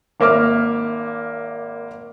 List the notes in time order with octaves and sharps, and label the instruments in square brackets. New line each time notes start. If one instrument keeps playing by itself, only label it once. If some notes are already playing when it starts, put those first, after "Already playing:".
[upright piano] G#1 A#3 E5 D6 F6